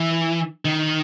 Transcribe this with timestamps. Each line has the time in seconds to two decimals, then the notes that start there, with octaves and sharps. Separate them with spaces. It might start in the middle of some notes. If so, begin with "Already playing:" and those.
Already playing: E3
0.65 D#3